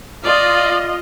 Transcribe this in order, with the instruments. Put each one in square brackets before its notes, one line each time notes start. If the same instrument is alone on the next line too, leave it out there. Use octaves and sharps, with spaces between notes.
[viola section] F4 D#5 [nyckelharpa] D5